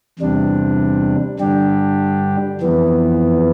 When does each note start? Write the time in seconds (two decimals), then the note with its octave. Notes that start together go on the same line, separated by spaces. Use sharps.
0.19 E2 C3 G3 D4
1.40 G2 D3 G3 D4 G4
2.61 F2 E3 B3